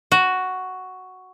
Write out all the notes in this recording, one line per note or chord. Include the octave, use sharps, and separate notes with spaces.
F#4